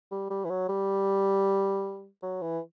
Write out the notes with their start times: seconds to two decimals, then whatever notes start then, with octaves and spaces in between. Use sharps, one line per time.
0.11 G3
0.30 G3
0.45 E3
0.50 F#3
0.69 G3
2.22 F#3
2.42 E3